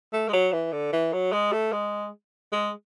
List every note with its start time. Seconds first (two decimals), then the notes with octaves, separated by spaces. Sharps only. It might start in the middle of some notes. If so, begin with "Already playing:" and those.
0.13 A3
0.29 G#3
0.33 F#3
0.53 E3
0.73 D3
0.93 E3
1.13 F#3
1.33 G#3
1.53 A3
1.73 G#3
2.53 G#3